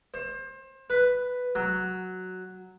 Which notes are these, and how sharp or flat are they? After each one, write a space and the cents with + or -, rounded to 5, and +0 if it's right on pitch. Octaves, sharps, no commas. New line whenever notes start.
C5 +30
B4 +5
F#3 +0